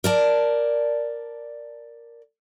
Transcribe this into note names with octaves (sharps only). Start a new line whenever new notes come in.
A#4 D5 A5